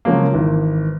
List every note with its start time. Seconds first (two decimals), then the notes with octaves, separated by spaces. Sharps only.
0.05 C#3 F3 F#3 G#3 A#3
0.34 G#1 E3